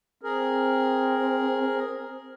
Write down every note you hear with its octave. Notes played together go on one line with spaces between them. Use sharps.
C4 G#4 A#4